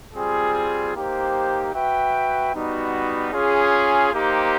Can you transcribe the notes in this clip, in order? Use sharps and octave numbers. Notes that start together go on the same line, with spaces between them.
G3 C4 F4 G#4
A#3 D#4 G4 C5
F#4 B4 E5 G5
G3 B3 D#4 F#4
C#4 F4 G#4
A#3 D#4 G4 C5